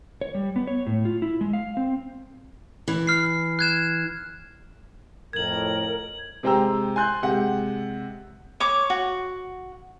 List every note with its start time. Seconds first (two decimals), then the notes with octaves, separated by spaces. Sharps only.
0.21 C#5
0.34 G3
0.56 B3
0.67 C#5
0.87 A2
1.05 F4
1.22 E4
1.41 G#3
1.53 F5
1.77 C4
2.88 E3
3.07 F6 C7
3.59 F#6 G#6 E7
5.33 F2 A2 A#4 G#6 F#7
6.43 C3 G#3 C5 G5 A#5 E6
6.96 G#5 C6 F#6 G6
7.22 C3 G#3 F#5
8.60 C#5 D6
8.90 F#4